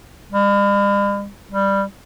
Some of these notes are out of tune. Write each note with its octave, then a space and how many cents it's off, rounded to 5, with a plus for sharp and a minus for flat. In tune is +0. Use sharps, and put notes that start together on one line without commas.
G3 +45
G3 +10